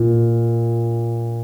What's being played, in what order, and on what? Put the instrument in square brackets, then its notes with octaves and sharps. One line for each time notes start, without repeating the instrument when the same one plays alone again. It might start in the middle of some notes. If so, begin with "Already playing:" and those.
Already playing: [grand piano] A#2